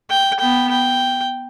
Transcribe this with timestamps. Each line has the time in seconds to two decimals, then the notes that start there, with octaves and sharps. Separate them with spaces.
0.10 G5
0.40 B3 G5
0.71 G5